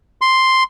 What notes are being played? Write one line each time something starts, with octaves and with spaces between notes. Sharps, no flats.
C6